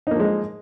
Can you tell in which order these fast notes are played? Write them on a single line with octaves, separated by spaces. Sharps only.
D#4 A#3 F3 G#3